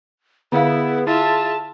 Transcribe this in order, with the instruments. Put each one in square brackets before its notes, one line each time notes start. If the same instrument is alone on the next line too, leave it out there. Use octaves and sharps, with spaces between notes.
[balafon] D3 F5 [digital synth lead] B3 [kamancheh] E4 [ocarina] G#4
[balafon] E4 [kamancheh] F4 E5 [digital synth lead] A5